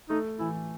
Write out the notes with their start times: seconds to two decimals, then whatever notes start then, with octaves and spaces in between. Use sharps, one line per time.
0.09 A3 D#4
0.39 E3 E4